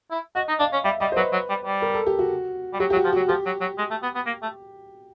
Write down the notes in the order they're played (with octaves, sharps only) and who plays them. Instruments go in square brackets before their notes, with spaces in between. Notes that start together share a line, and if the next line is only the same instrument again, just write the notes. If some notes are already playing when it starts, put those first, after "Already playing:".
[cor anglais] E4
[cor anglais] F#4 [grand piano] D#5
[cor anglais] D#4
[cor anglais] D4 [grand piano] F5
[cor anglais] C#4
[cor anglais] G3 [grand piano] E5
[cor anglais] G3 [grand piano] D#5
[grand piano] C5
[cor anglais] F#3 [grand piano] B4
[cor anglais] F#3
G3
G3
[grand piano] A#4
A4
G4
F#4
[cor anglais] G3
[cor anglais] F#3 [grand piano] G4
[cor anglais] F#3 [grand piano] G4
[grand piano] F#4
[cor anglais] F3
[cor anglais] F#3 [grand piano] F#4
[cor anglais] F3 [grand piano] G4
[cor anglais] F#3
F#3
G#3
A3
B3
B3
A#3
A3